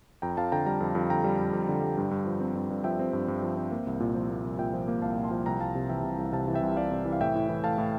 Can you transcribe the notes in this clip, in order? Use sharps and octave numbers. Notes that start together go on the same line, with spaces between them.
F2 G5 A#5
F2 F5 A5
D3 G5 A#5
G3 G5 A#5
F2
F2
D3 G5 A#5
G3
F2
F2
D3
G3
G2
G2
F3
C4
G2
G2
F3 E5 G5
C4
G2
G2
F3
C4
A#3
C2
A#2
F3
A#3
C2
A#2 E5 G5
F3
A#3
C2 F5 A5
A#2
A5 C6
F3
C2 G5 A#5
C2 F5 A5
C3
E3 E5 G5
C2
C2
C3 F5 A5
E3
E5 G5
C2
C2 D5 F5
C3
E3
F5
A2 E5 G5
A2
E3
A3 F5 A5
A2